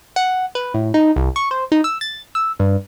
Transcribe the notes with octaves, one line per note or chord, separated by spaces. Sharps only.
F#5
B4
A2
D#4
C2
C#6
C5
D#4
E6
A6
E6
G2